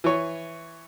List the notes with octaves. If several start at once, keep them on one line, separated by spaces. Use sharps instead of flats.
E3 C#5